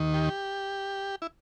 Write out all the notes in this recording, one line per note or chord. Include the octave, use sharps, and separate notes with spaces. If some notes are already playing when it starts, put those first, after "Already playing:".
Already playing: D#2 D#3
G4
E4